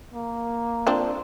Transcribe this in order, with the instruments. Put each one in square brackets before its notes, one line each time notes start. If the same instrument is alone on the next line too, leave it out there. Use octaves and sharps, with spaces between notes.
[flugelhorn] A#3
[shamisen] F3 C4 D4